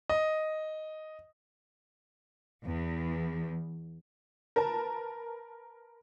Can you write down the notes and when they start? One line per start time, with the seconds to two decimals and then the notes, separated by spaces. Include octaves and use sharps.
0.10 D#5
2.66 E2
4.56 A#4 B4 A5